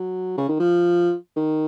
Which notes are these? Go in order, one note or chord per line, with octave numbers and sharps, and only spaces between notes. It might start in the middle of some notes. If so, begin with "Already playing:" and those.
Already playing: F#3
C#3
D#3
F3
D#3